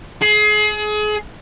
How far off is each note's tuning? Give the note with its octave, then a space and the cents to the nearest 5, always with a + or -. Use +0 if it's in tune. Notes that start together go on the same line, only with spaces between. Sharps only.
G#4 +30